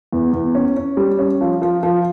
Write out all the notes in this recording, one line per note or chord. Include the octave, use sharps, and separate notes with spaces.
E2
E2
C#4
C#4
G3
C#4
F3
F3
F3